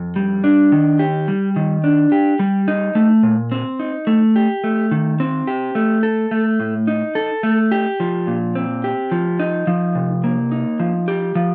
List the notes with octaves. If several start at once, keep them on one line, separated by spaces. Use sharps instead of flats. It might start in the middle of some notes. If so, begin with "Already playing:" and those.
Already playing: F2
G3
D4
D#3
G4
G3
D#3
D4
G4
G3
D#4
A3
A#2
C4
D#4
A3
G4
A3
D#3
C4
G4
A3
A4
A3
A2
D#4
A4
A3
G4
F3
A#2
C4
G4
F3
D#4
F3
C3
A#3
D#4
F3
G4
F3